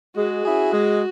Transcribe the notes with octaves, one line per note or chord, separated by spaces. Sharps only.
G#3 F#4
C#4 E4 G#4
G#3